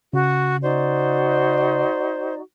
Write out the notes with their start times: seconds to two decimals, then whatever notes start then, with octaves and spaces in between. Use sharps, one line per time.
0.13 C#3 F#4
0.63 D#4 F#4 C5 D5